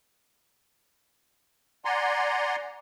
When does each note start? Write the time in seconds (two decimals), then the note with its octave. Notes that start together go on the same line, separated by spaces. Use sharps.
1.85 D5 F#5 G#5 A#5 C6